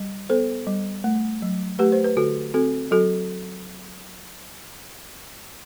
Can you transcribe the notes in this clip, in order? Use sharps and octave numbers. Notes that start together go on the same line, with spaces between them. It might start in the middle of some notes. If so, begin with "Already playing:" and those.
Already playing: G3
B3 A4 C5
G3
A3
F#3
A3 G4 B4
C5
B4
D3 F#4 A4
C4 F#4 A4
F#3 F#4 A4